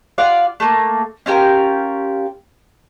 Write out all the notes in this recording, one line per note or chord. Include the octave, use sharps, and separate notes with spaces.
F4 D5 F5 F#5
A3 A#3
C#4 F4 G4 A#4